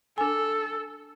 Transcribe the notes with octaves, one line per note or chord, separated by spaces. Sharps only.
D4 A4 G#5